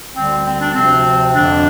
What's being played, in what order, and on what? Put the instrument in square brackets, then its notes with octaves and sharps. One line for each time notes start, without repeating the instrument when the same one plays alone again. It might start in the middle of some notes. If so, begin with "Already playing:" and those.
[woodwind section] D2 D3 G3 C4
C4
D4
D2 C3 F3 C4
F2 D3 F3 D4